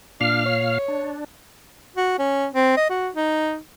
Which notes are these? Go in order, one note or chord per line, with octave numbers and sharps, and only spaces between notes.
A#2 D4 F5 F6
C#5
D4
F#4
C#4
C4
D#5
F#4
D#4